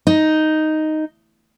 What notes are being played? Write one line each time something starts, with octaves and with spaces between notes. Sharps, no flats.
D#4